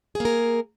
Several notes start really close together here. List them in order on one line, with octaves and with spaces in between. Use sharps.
G#4 A#3 A#4